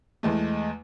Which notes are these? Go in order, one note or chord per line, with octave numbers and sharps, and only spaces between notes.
E2 G#3 A3